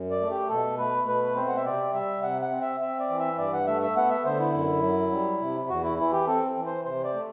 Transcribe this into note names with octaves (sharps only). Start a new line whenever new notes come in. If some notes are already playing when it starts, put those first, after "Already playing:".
Already playing: F#2
D5
A3
G4
B2 A4
A3 B4
B2 B4
C4 C5
F#5
E5
C3 D5
G3 E5
C3 F#5
F#5
C4
E5
C4 E5
D5
E3
E5
G2 D5
F#5
A3 E5
E5
B3 F#5
E5
D3 C5
E4
F#2
F#3
G3
C3
E2 F#4
E4
E3 E4
G4
C4 A4
E3
C5
C3 C5
D5
A3